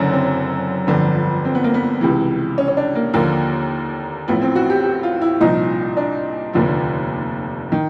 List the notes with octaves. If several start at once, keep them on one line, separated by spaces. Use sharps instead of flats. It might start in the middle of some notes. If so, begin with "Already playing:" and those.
Already playing: F#1 F#2 D3 C#4
C4
G1 F2 D3 F3
C4
B3
A#3
B3
C#2 C3 E3
C#4
C#4
D4
A#3
D#2 D3 F3 A#3
A1 A2 F3 B3
C4
F#4
G4
G4
F4
E4
C2 A#2 F3 D#4
D4
F1 D#2 D3 F3
D#3